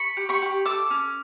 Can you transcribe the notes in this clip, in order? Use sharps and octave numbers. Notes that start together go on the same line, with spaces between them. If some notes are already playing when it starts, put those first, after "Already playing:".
Already playing: B5 C#6
G4
B5 C#6
G4
A4 D6 E6
C#4